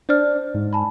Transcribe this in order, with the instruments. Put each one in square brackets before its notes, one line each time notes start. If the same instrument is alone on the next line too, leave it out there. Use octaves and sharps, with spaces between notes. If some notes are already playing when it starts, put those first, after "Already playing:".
[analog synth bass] D4 [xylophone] C5 D5 F6
[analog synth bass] G#2
[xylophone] G#5 A5 B5